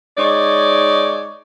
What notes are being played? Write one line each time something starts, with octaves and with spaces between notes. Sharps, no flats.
G#3 D#4 C#5 D5